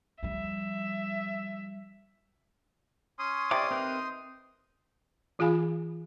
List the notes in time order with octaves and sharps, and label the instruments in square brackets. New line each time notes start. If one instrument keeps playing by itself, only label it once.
[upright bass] F3 G3 [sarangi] E5
[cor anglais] C#4 [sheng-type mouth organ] C6 D#6
[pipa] C3 [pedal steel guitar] D5 D6
[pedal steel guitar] C4 A#4 B4 [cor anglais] D#4
[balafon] E3 F4 G#4 F5 G#5 B5